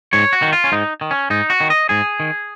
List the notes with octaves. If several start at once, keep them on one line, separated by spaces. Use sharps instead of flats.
G#2 C#5
F#4
D#3
F4
C#4
G#2 D#4
D#3
C#4
G#2 D#4
F#4
D#3
D#5
G#2 G#4
D#3